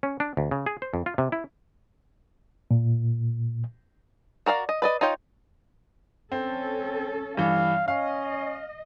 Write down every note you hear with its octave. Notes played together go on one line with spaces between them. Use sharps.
C#4
D4
D2
C#3
G#4
C5
F2
F4
C3
E4
A#2
F#4 A#4 D5 F5
D#5
B4 D5 D#5
D#4 F4 C#5 G5
C4 C#4 A4
G2 E3 F5
C#4 D#5 F5